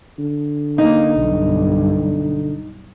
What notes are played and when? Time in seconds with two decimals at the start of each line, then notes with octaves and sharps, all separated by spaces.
0.19 D3
0.78 A#3 D#4
1.19 B1 G2